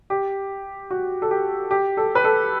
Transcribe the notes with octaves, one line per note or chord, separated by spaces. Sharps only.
G4
F#4
A4
G4
G4
A4
B4
A4